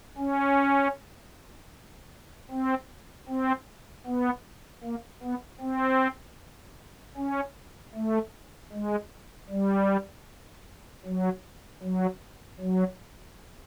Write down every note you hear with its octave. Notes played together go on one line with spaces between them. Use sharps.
C#4
C4
C4
B3
A#3
B3
C4
C#4
A3
G#3
G3
F#3
F#3
F#3